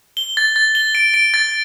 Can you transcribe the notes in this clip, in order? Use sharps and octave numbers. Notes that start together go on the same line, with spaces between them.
G7
A6
A6
G7
D7
D7
A6